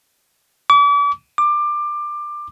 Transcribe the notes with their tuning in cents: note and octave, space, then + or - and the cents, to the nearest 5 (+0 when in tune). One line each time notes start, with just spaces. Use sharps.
D6 -40
D6 +20